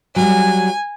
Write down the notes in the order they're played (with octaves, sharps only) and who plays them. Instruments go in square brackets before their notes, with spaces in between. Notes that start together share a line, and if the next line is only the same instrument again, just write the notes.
[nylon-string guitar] F#3 G3 [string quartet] G#5